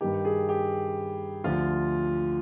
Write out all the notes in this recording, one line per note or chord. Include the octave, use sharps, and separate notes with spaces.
G2 D#3 G4
G#4
G4
D2 D3 F3 F4